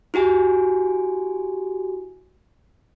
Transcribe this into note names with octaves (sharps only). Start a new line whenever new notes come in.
E4 F#4 G4 G#5